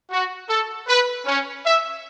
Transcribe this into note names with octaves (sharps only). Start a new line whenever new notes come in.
F#4
A4
B4
C#4
E5